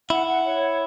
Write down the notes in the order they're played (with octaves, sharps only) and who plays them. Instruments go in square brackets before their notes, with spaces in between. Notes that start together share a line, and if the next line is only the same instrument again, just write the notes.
[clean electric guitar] E4 [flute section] F#5
[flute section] F#5
C#5
F#5